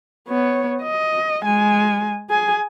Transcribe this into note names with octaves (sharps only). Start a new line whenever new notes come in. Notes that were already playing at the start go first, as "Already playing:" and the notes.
B3 C#5
D#5
G#3 G#5
G#4 G#5